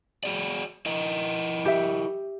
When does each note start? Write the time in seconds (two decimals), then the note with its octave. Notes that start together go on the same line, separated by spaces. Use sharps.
0.24 F#4 G#4 D5
0.86 E4 A#4 D#5
1.65 G4 E5